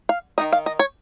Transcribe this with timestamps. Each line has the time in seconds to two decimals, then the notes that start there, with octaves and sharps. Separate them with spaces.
0.09 F5
0.38 D#3 A#3 D#4 D#5
0.53 F5
0.66 D#5
0.79 C#5